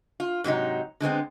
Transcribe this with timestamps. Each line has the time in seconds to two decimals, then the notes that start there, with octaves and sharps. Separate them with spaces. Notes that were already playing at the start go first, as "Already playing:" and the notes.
0.20 F4
0.44 G#2 C3 F#3 D#4
1.00 D3 G#3 B3 C4